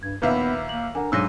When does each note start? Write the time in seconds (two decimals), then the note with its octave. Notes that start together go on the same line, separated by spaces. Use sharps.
0.03 G2 G#6
0.22 A#1 D#2 B3 B4 E5
0.69 A#3 F#7
0.95 D3 A#4 F#5 G#5
1.12 A#1 G#2 D3 F#3 E6 A#6 D#7